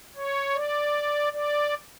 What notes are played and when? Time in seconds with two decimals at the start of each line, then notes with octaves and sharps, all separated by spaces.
0.15 C#5
0.54 D5
1.32 D5